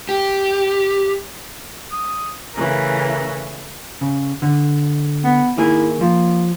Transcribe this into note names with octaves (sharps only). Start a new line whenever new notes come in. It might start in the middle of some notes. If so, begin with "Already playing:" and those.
G4
D#6
C#3 E3 A3 A#4
C#3
D3
B3
D#3 A#3 E4 G#4
F3 A#3